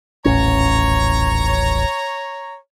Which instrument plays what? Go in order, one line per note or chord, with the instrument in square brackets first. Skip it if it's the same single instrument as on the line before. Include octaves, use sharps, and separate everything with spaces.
[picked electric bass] D#1 A1 C#4 [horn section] C#5 A#5